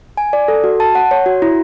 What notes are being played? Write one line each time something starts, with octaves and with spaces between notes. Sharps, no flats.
G#5
D5
A4
F#4
A5
F#5
C#5
F#4
E4